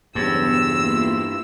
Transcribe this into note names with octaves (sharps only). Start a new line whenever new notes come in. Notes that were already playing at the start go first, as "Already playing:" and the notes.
E2 G2 C#3 F#3 B3 E6
A#3 E4 F4